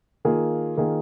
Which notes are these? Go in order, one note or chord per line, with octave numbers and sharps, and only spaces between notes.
D#3 A#3 F4 G#4
D#3 A#3 F4 G#4